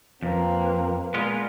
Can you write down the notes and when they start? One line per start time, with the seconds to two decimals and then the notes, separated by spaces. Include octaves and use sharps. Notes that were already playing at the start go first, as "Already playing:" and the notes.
0.23 F2 A#3 C4 B4
1.14 A#2 G#3 B3 F4